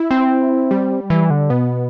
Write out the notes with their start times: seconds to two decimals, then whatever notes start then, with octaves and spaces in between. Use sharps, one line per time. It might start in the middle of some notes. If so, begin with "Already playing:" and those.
Already playing: E4
0.11 C4
0.71 G3
1.10 E3
1.30 D3
1.50 B2 B3